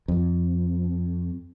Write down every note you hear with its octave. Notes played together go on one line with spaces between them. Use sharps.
F2